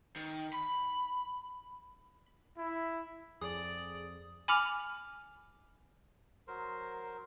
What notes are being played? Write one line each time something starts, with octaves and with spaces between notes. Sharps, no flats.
D#3
B5
E4
F2 G#4 D5 D#6
G#5 B5 D6 F6 F7
F#3 A#4 C5